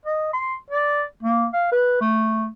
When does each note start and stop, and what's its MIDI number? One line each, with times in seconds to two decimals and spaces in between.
0.05 0.32 75
0.33 0.56 84
0.70 1.04 74
1.23 1.46 58
1.53 1.71 77
1.72 1.98 71
2.01 2.47 57